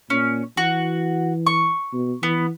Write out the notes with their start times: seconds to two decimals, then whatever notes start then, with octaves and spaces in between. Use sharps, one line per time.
0.10 A#2 C#4
0.57 E3 F#4
1.46 C#6
1.93 B2
2.23 E3 B3